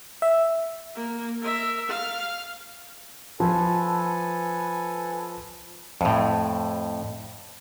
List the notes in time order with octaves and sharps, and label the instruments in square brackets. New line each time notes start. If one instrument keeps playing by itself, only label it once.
[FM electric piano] E5
[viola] A#3
A#4 E5
F5
[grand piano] F3 [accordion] A4 B4 G#5
[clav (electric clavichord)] F2 A2